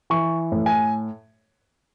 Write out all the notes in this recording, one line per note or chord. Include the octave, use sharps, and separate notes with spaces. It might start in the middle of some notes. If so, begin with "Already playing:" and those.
E3 C#6
A2
G#5